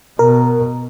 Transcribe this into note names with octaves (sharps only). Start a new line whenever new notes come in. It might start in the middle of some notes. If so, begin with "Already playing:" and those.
B2 A#4